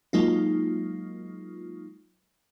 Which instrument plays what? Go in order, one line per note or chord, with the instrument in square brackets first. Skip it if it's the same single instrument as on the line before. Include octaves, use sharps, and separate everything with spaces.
[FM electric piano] F#3 G#3 A#3 D#4 F4